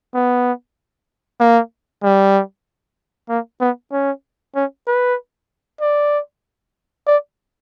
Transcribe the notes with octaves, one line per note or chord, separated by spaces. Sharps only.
B3
A#3
G3
A#3
B3
C#4
C#4
B4
D5
D5